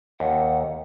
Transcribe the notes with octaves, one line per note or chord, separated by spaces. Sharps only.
D#2 F#5